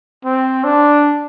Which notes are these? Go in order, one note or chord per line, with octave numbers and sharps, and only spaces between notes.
C4
D4